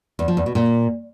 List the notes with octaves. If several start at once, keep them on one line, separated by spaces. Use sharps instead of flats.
E2
F3
E2
B2
A#2